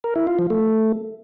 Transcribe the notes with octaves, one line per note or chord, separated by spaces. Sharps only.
A#4
E4
F4
F3
A3